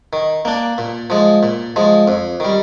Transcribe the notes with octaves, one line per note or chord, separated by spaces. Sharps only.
D#3
A#3 D4
A#2
F3 G#3
A#2
F3 G#3
F2
D#3 G3